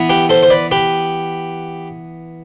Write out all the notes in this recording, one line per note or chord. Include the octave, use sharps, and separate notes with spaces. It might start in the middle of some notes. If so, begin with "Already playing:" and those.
Already playing: E3 B3
G4 B4
A4 C5
C5
B4 D5
G4 B4